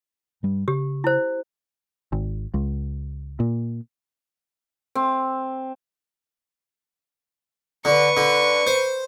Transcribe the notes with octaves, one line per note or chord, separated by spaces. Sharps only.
G2 G3
C#3 G4
E4 C5
G#1
C#2
A#2
C4
D3 B4 C#6
D3
C5